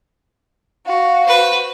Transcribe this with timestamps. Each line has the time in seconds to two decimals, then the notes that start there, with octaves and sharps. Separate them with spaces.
0.86 F#4 F5
1.25 B4 C5